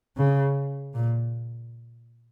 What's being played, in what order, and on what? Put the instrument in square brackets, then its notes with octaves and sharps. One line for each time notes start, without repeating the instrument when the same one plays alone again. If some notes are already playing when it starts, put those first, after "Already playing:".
[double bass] C#3
A#2